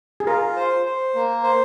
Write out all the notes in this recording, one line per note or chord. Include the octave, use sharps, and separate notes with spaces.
G#4
F4 A#4
C5
C5
A#3
C5